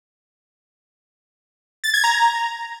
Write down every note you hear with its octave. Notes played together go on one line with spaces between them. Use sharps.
A6
G#6
A#5